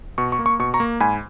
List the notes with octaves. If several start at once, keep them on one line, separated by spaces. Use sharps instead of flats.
B2 C#6
C#6
A#3
C#6
B2 C#6
A#5 C#6
A#3
G#2 G#5 B5